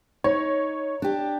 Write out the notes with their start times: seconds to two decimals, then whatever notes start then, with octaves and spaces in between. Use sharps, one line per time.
0.24 D#4 C#5
1.02 D4 G4